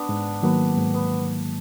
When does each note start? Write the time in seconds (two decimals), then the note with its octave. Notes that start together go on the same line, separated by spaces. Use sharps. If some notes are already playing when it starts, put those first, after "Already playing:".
Already playing: B3 D4
0.09 G#2
0.43 D#3 F#3 A#3 B3
0.77 G#2
0.94 B3